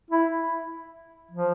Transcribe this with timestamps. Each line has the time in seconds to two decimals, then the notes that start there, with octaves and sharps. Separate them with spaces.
0.11 E4
1.31 F3